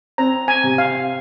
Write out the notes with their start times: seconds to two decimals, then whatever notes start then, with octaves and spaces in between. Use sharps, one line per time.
0.18 C4 A#5
0.48 G#5
0.64 C3
0.78 F5